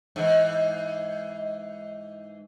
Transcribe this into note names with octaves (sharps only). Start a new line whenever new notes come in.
G#2 E3